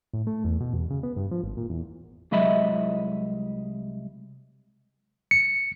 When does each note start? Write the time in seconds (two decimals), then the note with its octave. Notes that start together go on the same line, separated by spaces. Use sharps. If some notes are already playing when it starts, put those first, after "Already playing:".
0.13 A2
0.27 A3
0.44 E2
0.60 B2
0.73 E2
0.90 C#3
1.03 B3
1.16 G2
1.31 F3
1.44 G#1
1.57 A#2
1.70 E2
2.31 C2 F#3 G#3 D#5 E5 B5
5.31 C#7